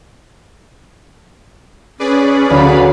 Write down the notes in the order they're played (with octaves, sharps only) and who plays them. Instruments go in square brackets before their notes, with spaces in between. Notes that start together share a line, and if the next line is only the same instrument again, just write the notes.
[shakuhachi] C#4 [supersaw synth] G#4 B4 D5
[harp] D2 [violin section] C#5 F5 B5